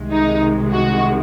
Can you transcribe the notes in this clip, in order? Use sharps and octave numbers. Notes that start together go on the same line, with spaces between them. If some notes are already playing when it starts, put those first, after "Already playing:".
Already playing: C2 C3 D#3 G#3
D#4
F#4